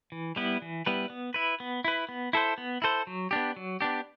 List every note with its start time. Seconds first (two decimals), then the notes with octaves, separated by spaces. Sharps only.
0.12 E3
0.36 G3 B3 E4 B4
0.62 E3
0.86 G3 B3 E4 B4
1.10 B3
1.34 E4 B4
1.60 B3
1.85 E4 B4
2.09 B3
2.33 E4 A4 C5
2.58 B3
2.82 E4 A4 C5
3.07 F#3
3.31 B3 D4 G4
3.56 F#3
3.81 B3 D4 G4